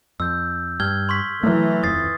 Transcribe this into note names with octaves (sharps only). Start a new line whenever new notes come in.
F2 E6 G6
G2 F6 G#6 G7
C6 C#6 B6
E3 F#3 A3
D#1 F2 D#6 A6 C7